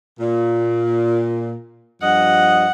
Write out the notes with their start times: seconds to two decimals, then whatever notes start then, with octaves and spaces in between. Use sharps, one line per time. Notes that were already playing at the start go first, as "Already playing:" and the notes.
0.20 A#2
2.02 G2 F3 D#5 F#5